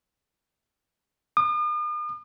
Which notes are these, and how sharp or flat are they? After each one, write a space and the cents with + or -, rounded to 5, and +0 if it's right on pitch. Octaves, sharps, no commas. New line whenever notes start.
D#6 -45